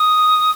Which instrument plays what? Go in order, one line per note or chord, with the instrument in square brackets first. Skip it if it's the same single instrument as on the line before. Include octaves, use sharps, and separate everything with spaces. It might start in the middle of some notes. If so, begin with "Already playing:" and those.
Already playing: [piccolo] D#6